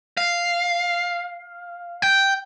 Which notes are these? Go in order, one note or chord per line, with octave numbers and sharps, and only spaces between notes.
F5
G5